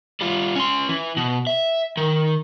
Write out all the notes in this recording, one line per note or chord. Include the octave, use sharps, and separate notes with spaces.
G3 F4
C#4 C6
E3
B2
E5
D#3